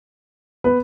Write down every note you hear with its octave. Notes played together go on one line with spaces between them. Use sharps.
B3 B4